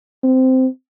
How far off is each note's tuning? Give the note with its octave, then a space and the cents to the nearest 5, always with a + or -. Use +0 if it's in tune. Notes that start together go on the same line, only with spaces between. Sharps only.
C4 -15